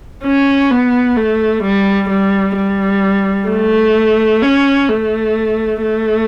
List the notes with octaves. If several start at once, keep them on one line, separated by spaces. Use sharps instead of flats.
C#4
B3
A3
G3
G3
G3
A3
C#4
A3
A3